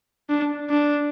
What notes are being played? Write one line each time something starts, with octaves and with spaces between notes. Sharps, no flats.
D4
D4